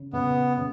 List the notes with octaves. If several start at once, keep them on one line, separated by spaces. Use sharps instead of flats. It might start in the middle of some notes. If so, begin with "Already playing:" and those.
Already playing: C#3
C#3 B3
C#3